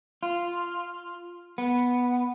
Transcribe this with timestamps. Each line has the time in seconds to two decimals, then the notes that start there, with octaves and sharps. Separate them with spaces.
0.23 F4
1.58 B3